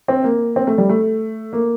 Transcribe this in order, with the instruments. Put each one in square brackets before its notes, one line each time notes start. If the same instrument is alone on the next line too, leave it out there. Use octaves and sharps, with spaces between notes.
[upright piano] C4
A#3
C4
A3
G3
A3
A#3